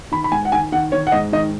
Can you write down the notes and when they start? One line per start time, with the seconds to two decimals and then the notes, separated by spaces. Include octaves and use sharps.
0.12 D#3 B5
0.24 B5
0.32 G#2 G#5
0.45 F#5
0.52 D#3 G#5
0.72 D#3 F#5
0.92 D#3 C#5
1.07 F#5
1.12 G#2 D#5
1.33 D#3 D#5